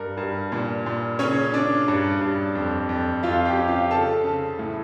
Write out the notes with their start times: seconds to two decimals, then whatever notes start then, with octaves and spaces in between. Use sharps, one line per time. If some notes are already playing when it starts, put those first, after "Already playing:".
Already playing: G2 A#4
0.17 G2
0.52 A#2
0.86 A#2
1.19 C#3 C#4 C#5
1.53 C#4 D4 D5
1.88 G2
2.21 G2
2.55 F2
2.89 F2
3.23 F2 F4 F5
3.45 G4 G5
3.58 C#4
3.68 F4 F5
3.91 C#3 A4 A5
4.24 C#3
4.59 A2